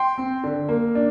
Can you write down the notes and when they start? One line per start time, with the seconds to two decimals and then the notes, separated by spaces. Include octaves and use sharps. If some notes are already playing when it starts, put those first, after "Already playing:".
Already playing: G5 C6
0.18 C4
0.44 D3
0.69 A#3
0.95 D4